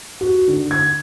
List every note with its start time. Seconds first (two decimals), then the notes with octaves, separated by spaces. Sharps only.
0.21 F#4
0.47 D3
0.71 G#6